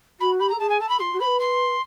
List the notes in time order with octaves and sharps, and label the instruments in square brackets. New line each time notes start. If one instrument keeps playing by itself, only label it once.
[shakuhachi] F#4 [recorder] B5
[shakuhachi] G4 [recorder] B5
[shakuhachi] A4 [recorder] A#5
[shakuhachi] G#4 [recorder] A5
[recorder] G#5
[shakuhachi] A4 [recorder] A5
[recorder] B5
[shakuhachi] F4 [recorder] C6
[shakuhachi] F#4
[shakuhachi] C5 [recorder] B5
[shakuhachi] B4
[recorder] C6